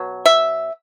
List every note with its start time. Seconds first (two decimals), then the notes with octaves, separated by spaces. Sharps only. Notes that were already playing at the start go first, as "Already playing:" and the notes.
Already playing: B2 F#3
0.26 E5